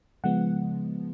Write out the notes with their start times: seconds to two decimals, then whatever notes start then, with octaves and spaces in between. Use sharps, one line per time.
0.24 C#3 F3 G#3 B3 F#5